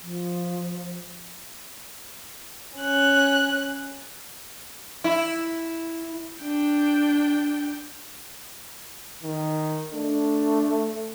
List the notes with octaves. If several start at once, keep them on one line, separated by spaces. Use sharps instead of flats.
F3
C#4 F#6
E4
D4 G5
D#3
A3 D4